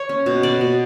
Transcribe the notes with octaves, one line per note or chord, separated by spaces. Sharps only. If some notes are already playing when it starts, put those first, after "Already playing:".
Already playing: C#5
C#4
B2
B2 D5
B2